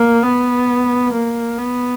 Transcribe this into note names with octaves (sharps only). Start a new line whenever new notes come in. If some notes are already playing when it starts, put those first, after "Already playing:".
Already playing: A#3
B3
A#3
B3